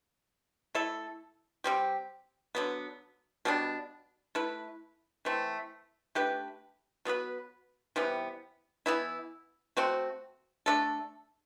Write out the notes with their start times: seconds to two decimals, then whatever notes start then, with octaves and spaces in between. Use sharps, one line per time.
0.75 A3 E4 A4
1.64 G3 C4 G4
2.55 D3 F#3 B3
3.45 B2 G3 B3 D4
4.35 A3 E4 B4
5.25 E3 A3 C4
6.15 A3 D4 G4 B4
7.05 F#3 B3 F#4 B4
7.96 C3 E3 G3 B3
8.86 E3 B3 E4
9.77 A3 C4 F#4
10.66 A3 D4 A4